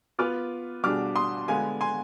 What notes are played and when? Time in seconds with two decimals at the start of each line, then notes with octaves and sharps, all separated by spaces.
0.19 B3 F4 B4 D6 F6
0.83 B2 G3 D4 G#4 D6 F6
1.16 C6 D#6
1.48 D3 G#3 B3 F5 G#5
1.81 G#5 C6